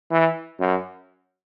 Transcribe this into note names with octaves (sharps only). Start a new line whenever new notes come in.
E3
F#2